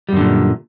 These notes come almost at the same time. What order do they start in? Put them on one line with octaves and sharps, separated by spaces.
G3 F#2 D3 A#2